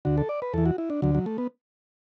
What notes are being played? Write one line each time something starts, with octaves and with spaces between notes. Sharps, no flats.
D2 D3 F#4
A4
D5
B4
E2 E3 A4
F#4
E4
D4
D2 D3 F#3
F#3
A3
B3